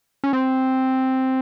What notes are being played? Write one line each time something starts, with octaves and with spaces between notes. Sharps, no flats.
C#4
C4